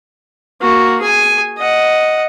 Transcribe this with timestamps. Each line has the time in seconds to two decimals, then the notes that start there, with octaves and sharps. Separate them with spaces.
0.61 A#3 F#4
1.01 G#4 G#5
1.57 D#5 F#5